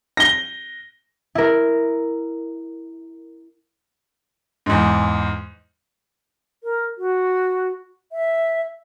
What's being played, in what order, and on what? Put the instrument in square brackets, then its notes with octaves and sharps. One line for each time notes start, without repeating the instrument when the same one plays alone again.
[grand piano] A#6 G7
[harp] E4 A#4
[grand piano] E2 G#2
[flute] A#4
F#4
E5